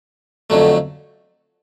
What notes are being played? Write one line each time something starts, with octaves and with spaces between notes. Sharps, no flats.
F2 D3 F#3 A3